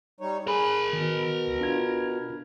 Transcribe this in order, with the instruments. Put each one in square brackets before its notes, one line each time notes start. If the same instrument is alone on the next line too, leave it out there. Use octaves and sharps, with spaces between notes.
[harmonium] G3 D#4 C#5
[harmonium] G#4 [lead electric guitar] A#4 B5
[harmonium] B2 [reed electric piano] D#3
[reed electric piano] C#2
D4 F4 G#6